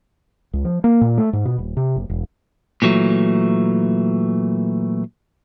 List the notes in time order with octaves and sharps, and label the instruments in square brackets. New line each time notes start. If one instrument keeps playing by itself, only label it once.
[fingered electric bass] C#2
F3
A#3
A#2
A3
G#2
B2
D#1
C3
F#1
E1
[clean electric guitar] A#2 E3 F#3 A3